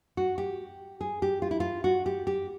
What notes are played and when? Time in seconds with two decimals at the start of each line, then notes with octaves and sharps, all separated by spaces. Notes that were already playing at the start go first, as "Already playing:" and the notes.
0.17 F#4
0.38 G4
1.01 G#4
1.22 G4
1.42 F4
1.51 E4
1.60 F4
1.84 F#4
2.06 G4
2.27 G4